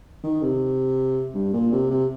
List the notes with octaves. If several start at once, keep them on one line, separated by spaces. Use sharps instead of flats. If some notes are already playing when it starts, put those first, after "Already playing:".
D#3
C3
G2
A#2
C3
C3